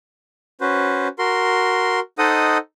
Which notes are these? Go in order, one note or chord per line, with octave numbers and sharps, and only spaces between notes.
C#4 F#4 B4 C5
F#4 A#4 C6
D#4 A4 C5 D#5 F#5 D#6